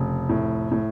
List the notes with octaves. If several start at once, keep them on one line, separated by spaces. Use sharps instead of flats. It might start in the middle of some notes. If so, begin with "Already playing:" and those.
Already playing: F1 C#3
A2
A2